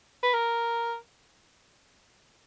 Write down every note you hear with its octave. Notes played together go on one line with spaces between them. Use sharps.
B4
A#4